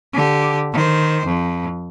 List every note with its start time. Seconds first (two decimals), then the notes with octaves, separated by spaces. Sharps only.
0.13 D3 G4
0.73 D#3 C5
1.25 F2